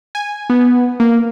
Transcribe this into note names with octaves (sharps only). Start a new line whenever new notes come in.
G#5
B3
A#3